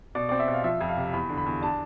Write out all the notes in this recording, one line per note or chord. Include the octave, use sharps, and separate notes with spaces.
B2 D5
C4 D5
E5
B2
F5
F3 E5
F2
F5
C3
E2 B5
D3
B5
E2
D4 A5